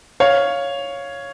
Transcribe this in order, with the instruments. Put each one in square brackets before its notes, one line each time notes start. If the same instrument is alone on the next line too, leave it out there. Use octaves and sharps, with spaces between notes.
[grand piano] C#5 F5